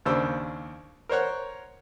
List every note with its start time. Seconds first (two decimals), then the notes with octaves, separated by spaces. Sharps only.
0.06 D#2 C#3 D4 C5 E6
1.09 A#4 C5 C#5 F#5